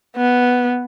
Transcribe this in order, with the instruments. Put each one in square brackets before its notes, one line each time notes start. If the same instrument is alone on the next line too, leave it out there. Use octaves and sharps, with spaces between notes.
[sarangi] B3